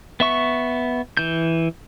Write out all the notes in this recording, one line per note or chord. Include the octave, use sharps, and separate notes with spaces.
B3 E5 C#6
E3 G6